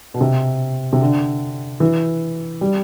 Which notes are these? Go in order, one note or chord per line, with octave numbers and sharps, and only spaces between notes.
B2
C3
C3
D3
E3
G3